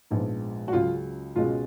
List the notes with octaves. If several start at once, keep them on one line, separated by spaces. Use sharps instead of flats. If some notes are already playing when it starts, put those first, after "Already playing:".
A#1 G#2 F3 G#3 B3
F#4
C#2 C#3 F#3 C#4 F4
C#2 B2 G#3 C#4 F4